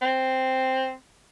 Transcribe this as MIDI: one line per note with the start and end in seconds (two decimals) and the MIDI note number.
0.01 0.92 60